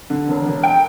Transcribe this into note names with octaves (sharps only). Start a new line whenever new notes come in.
D3
E1
E1
G5